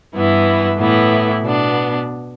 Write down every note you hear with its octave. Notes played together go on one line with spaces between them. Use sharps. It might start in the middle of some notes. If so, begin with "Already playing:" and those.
G2 E3 B3 E4
A2 E3 B3 E4
B2 B3 D4